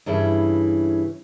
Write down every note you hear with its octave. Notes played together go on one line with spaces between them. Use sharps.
G2 C#3 E3 E4